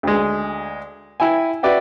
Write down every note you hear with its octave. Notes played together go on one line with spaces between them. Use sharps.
D2 G#3
E4 G5 G#5
F#4 B4 D5 E5 G5